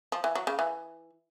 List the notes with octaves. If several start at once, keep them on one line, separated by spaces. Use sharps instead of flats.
F3
E3
F#3
C#3
E3